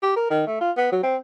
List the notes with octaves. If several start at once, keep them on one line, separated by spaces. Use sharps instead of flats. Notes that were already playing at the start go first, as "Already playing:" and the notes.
G4
A#4
D#3
A3
F4
B3
F#3
C4